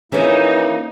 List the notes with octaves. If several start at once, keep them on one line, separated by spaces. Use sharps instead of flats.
E3 F3 A#3 C#4 D#4 E4 G#4